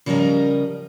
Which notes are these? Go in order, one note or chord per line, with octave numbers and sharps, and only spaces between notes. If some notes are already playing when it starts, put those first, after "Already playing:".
C#3 F3 G3 A4 A#4 D#5